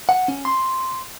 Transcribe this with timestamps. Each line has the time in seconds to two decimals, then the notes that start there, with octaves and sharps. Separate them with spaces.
0.09 F#5
0.28 C#4
0.45 C6